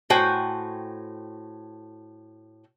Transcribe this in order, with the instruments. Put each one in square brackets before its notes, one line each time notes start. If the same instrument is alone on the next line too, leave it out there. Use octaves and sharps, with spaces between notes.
[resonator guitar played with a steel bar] A2 F#4 C5 G5 G#5